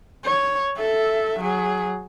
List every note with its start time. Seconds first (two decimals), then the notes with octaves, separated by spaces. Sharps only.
0.24 C#5
0.77 A4 E5
1.40 F#3 G#4